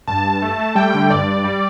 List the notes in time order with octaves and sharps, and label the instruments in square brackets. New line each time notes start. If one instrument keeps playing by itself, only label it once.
[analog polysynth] G2 A5
G2
A3
A3
G3 G5
D3 G5
G2 D5
G2
G3